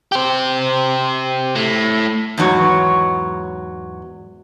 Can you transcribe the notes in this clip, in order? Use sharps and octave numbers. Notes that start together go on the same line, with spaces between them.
G4 C5
A2
E2 G#2 F#3 C#5